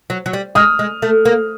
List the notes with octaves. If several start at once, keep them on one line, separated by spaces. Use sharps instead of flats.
F#3
F#3
G3
G#3 D#6 F6
G#3
A3
A#3